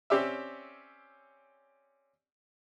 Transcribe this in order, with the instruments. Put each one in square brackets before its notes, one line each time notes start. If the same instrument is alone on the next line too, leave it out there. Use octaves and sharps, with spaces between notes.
[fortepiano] C4 C#4 G4 D5 E5